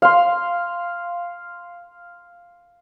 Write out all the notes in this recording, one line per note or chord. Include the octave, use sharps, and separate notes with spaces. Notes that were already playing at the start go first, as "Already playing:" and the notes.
F5 C6